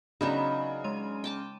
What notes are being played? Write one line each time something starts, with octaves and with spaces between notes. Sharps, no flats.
C#3 F#3 B3 D4 D#4 F5 B5 E7
G#3 C6 D#7
G5 A5 D6